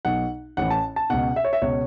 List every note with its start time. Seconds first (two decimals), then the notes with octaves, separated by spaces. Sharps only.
0.05 B1 B2 F#5
0.57 A1 A2 E3 F#5
0.70 A5
0.96 A5
1.10 C#2 B2 F#5
1.36 E5
1.45 C#5
1.53 E5
1.62 C#2 B2 C#5